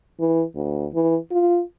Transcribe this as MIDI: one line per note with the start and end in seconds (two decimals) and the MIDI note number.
0.20 0.43 52
0.55 0.87 38
0.94 1.16 52
1.31 1.61 65